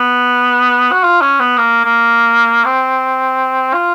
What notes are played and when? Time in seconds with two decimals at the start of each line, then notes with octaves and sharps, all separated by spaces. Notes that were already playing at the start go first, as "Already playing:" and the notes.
Already playing: B3
0.92 F#4
1.03 F4
1.21 C#4
1.40 B3
1.58 A#3
1.85 A#3
2.65 C4
3.73 F4